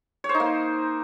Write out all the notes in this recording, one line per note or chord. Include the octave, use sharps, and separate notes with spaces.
C#5
C5
D#4
A#3